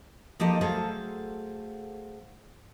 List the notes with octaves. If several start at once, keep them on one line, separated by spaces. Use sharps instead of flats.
F3 A#3 D#4 G4 A4 D#5
F#3 A3 G#4 A4 C5 F5